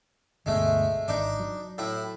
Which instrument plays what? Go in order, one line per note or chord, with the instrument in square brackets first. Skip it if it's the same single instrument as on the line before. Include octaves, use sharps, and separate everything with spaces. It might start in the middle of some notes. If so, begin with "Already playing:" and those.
[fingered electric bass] G1 D2 B2 [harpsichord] G#3 A3
[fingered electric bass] G#1 [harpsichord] D4 D#4
[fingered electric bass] F#3
[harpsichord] A2 E4